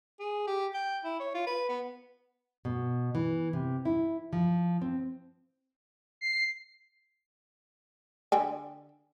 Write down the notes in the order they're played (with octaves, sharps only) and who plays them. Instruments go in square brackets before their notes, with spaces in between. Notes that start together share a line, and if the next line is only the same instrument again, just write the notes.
[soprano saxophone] G#4
G4
G5
E4
C#5
F4
B4
B3
[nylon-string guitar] B2
E3
C3
E4
F3
C4
[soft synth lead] C7
[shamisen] D3 G5 G#5